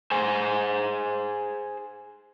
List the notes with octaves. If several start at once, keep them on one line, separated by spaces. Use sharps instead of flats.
G#4 C5 G#5